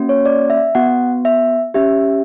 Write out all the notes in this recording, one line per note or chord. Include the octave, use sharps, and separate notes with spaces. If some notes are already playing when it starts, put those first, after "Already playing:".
Already playing: A#3 C#4 F#4
C#5
D5
E5
B3 F#4 F#5
E5
C#4 G4 E5